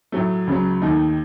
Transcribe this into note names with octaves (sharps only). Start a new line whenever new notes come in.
A2 F#3 A3
C#2 C#3 F#3
D#2 D#3 A3 D#4